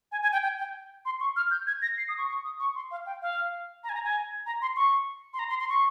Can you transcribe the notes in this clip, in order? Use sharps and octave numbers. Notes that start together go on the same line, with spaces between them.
G#5
G#5
G5
G5
G5
C6
C#6
F6
G6
G#6
A#6
C7
D#6
C#6
C#6
D#6
C#6
C6
F5
G5
F5
A#5
G#5
A#5
G#5
A#5
C6
C#6
C6
A#5
C6
C6
C#6